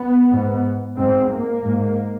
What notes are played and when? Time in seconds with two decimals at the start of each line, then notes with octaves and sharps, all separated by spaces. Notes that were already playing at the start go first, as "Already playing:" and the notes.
Already playing: B3
0.31 G#2
0.97 G#2 C4
1.30 A#3
1.62 G#2